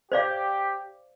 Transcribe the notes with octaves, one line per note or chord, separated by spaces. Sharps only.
G4 C5 D5 F5